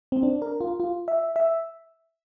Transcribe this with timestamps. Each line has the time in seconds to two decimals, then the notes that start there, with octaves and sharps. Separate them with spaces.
0.12 C4
0.23 D4
0.42 A#4
0.61 F4
0.80 F4
1.08 E5
1.36 E5